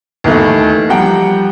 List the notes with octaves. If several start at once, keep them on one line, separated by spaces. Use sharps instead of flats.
D#2 D#3 E3 A3
F3 G3 F#5 G5 A#5